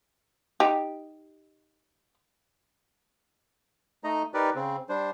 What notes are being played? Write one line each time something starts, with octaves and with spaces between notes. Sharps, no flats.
D#4 G4
A3 D#4 D#5 A#5
D#4 G4 A#4 B4 D5
C#3 C4
G3 D4 C5